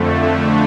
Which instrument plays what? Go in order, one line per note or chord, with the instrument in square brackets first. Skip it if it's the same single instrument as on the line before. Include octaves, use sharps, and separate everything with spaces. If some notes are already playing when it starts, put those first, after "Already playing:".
Already playing: [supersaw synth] F2 D3 A3